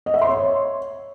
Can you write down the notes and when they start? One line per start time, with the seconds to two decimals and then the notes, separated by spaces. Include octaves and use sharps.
0.06 D#5
0.14 E5
0.22 C6
0.29 C#5